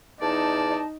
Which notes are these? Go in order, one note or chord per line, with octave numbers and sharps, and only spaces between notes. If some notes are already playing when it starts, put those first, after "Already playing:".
E2 D#4 D5 A5